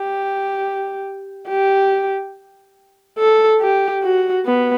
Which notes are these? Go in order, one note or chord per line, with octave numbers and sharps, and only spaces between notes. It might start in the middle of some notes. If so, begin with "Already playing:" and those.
Already playing: G4
G4
A4
G4
F#4
B3